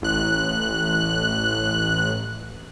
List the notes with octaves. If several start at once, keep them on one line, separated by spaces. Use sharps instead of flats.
A1 F#6